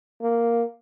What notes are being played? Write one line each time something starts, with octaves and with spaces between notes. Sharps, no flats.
A#3